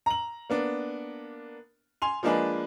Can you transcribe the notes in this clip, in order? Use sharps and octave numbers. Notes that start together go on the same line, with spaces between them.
A#5 F#7
A#3 B3 D4
G#5 C6 F7
F3 G#3 A#3 D4 G#4 B4